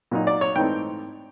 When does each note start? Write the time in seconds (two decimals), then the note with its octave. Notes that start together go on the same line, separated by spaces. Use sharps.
0.11 A#2 F#3 A#3 D#4
0.27 D5
0.41 C#5
0.56 G#2 E3 A3 C4 D#4 G5